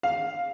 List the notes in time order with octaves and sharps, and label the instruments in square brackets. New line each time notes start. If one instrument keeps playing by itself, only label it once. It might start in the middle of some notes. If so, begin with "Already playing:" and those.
[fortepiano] F5